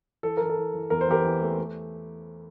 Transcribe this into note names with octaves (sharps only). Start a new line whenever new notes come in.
E3 A4
E3 A#4
A4
E3
E3
E2 A#4
C5
E2 G4 A#4
E3
A3
A3